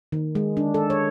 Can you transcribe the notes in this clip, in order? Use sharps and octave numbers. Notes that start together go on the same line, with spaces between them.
D#3
G#3
D4
A4
C#5